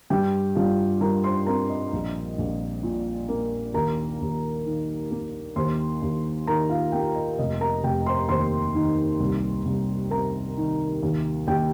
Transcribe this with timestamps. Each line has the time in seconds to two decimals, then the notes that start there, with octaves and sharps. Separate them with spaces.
0.10 G2 G4 G5
0.55 G2 F4 F5
1.01 G3 A#4 A#5
1.24 C5 C6
1.46 C4 A#4 A#5
1.70 D#5
1.93 A#1
2.38 A#1
2.83 A#2
3.29 A#3
3.74 D#2 A#4 A#5
4.21 D#2
4.66 D#3
5.11 A#3
5.56 D#2 C5 C6
6.02 D#2
6.47 D#3 A#4 A#5
6.69 F4 F5
6.92 A#3 G4 G5
7.15 D#5
7.38 F1 D#5
7.61 A#4 A#5
7.84 F1 G4 G5
8.06 C5 C6
8.29 D#2 C5 C6
8.75 D#3
9.20 C2
9.65 C2
10.11 C3 A#4 A#5
10.57 D#3
11.02 D#2
11.47 D#2 G4 G5